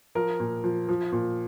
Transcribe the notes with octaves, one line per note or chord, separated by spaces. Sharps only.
F3 A#4
A#2
F3
F3
A#2